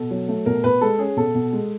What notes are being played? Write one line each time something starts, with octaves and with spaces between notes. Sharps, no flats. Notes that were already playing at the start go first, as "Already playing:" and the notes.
Already playing: B2 A4
F#3
A3
B2 A#4
B2 B4
G#3 A4
C#4 G#4
B2 A4
B2
G#3